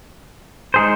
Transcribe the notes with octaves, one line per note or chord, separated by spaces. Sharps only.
G#3 D#4 G#4 C5